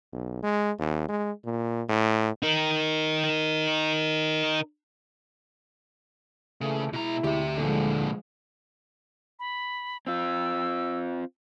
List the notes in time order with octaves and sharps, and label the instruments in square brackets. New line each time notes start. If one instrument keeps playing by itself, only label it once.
[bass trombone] B1
G#3
D#2
G#3
A#2
A2
[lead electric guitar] D#4 A#4
[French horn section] A#2 E3 A3 [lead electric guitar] C#3
[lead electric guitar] B2 A#5 [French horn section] G#3 E4
[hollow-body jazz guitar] D2 [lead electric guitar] G4 E5
[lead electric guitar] A#2 D3 [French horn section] E3 A4 [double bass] F3 G#3
[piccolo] B5
[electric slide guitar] C4 F4 [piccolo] E6